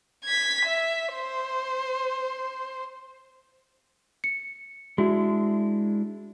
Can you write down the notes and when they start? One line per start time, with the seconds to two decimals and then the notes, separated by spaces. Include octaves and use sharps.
0.25 G#6 B6
0.65 E5
1.14 C5
4.24 C#7
4.98 G#3 D4 E4 F#4